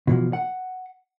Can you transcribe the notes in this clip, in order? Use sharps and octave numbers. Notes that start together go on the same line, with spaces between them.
B2 E3 F3
F#5